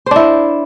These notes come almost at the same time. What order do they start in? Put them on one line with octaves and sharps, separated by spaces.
C5 D4 E4